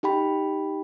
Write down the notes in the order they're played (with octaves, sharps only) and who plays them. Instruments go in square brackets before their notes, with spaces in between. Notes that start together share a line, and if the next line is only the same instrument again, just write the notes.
[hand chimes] D#4 G4 G5 B5